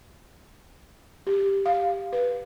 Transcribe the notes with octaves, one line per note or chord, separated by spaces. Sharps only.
G4
F5
B4